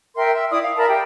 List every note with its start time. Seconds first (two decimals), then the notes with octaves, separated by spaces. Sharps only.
0.16 A#4 E5 G5 C6
0.33 E5
0.51 E4 D5 D#6
0.63 F5
0.77 A#4 E5 A5 B5
0.88 G4 G5